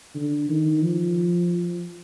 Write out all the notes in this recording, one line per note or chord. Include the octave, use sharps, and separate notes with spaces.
D3
D#3
F3